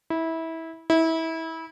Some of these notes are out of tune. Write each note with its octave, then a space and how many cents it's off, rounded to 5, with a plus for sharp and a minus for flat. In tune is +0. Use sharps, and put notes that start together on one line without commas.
E4 -20
E4 -25